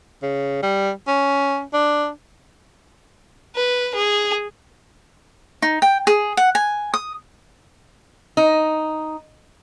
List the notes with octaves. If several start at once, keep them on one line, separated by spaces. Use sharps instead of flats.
C#3
G3
C#4
D4
B4
G#4
D#4
G5
G#4
F#5
G#5
D#6
D#4